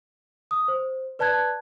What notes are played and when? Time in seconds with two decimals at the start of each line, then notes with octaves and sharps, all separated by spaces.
0.51 D#6
0.68 C5
1.19 B4 D5 A5 F#6 G#6